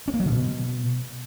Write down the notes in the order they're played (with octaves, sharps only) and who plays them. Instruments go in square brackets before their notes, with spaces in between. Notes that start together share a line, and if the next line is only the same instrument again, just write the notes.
[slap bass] C#4
A#3
F#3
D3
B2